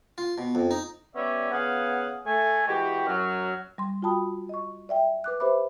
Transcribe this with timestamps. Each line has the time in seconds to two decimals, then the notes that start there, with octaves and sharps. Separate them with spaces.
0.18 F4
0.38 B2
0.55 F2
0.71 D#4
1.15 G3 B3 C#4 D5 E5
1.51 C#3 B3 F5 F#5 G#5 D#6
2.26 A3 G#5
2.67 E3 G#3 F#4 G4
3.06 F#2 F#3 F6
3.78 G3 C6
4.02 F4 F#4 G5 A5 B5 D#6
4.49 D#5 C#6
4.89 D5 E5 G5
5.24 B4 D6 F#6
5.40 G4 B4 C5 E5 B5 D6